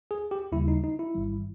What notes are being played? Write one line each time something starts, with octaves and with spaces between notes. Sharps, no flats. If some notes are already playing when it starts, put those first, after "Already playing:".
G#4
G4
D#2 C#3 G3 E4
D#4
D#4
E4
G1 G2 D#3 G3